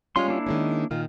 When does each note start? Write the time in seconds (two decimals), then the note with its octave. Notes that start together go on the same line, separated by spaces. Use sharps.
0.16 G3 G#3 C#4 F4 C6
0.28 A#3 D4 E4
0.46 D#3 G#3 C#4
0.91 A#2 D#3 F4